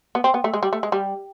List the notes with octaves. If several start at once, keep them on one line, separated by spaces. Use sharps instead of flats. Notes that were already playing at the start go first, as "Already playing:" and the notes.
B3
C4
B3
A3
G#3
G3
A3
G#3
G3